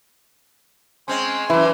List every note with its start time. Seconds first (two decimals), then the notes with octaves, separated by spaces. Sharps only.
1.08 G#3 C4 C#4 G#5 C6
1.50 F#2 E3 E4 B4